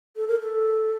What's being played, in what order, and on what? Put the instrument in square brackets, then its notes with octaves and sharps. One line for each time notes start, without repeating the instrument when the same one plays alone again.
[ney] A4
A#4
A4